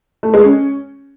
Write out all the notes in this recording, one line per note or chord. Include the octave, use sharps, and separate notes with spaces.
A3
G#3
C#4